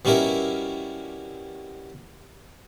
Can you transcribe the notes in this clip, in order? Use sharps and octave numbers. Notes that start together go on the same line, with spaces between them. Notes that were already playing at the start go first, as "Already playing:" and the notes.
B2 G3 C#4 E4 A#4